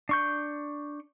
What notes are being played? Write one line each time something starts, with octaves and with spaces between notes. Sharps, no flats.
D4 C#6 G6